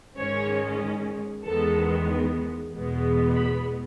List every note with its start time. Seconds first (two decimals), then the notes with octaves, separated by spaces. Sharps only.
0.17 G#2 D#3 G#3 C#4 C#5
1.44 E2 D#3 G#3 B3 A4
2.72 E2 B2 G#3 B3
3.35 B5